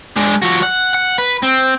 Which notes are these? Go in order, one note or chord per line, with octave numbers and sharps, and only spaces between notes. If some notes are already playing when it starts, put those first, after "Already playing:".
G#3 D4
F3 F#4
F#5
F#5
B4
C4